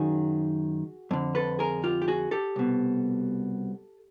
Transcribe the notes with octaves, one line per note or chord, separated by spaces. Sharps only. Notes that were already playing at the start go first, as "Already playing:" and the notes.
Already playing: F#2 D#3 F#4 G#4
F2 D3
A4 B4
G#4 A#4
F4 G4
G4
F#4 G#4
G4 A4
C2 B2